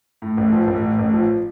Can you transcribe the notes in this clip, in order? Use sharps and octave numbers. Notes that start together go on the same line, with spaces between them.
A2
A1
F3
A1
A2
A1
F3